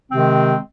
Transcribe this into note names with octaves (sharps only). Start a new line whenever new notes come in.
C3 D#3 G#3 C4